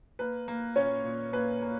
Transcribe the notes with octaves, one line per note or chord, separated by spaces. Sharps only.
A#3 B4
A#3
A#2 C#4 C#5
A#2
A#3 B4
A#3